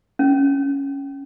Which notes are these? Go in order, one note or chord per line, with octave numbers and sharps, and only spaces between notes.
C#4